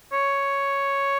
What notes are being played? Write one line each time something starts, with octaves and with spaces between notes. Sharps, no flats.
C#5